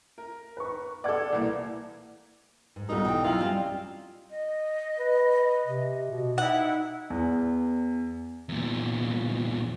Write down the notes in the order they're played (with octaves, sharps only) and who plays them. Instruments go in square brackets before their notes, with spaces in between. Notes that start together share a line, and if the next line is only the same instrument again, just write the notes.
[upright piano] A#4
[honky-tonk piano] B4 C#6
[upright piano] A4 D6 [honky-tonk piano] D5 F#5 G#6
[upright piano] C2 E3 A#3
[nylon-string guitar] G#2
[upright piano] B1 A#4 [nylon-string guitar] G3 A3 F4 [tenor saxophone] D#4
[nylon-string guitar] E3 G5
[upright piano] F#2 E4 F#7 [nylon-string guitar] F#3 [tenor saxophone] F4
[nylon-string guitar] G3 C4 C#4 [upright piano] D5
[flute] D#5
[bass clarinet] B4
C3
B2
[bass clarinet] D#4 [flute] E4 [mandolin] F#5
[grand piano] E2
[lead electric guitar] E2 A#2